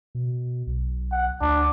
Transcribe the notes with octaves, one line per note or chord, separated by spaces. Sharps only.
B2
B1
F#5
D2 D4